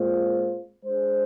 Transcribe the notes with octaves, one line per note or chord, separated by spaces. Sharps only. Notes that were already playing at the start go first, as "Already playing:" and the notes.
Already playing: A#2 G#3 C4 F4 C5
G#3 D4 G#4 C5